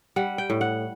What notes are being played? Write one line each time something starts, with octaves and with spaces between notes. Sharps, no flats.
G3 F#5
G5
A2
F#5